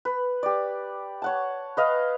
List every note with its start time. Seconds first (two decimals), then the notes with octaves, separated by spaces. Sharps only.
0.05 B4
0.43 G4 D5
1.22 C#5 F#5 A5
1.77 B4 D#5 F5